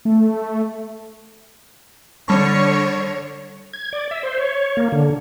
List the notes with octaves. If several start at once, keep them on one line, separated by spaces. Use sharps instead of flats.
A3
D3 G3 C#5 A5 C#6
G#6
D5
E5
C5
C#5
A#3
D3